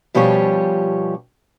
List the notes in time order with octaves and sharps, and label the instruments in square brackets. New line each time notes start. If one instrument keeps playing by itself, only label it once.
[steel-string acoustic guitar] B2 F3 G3 C#4 G4 C#5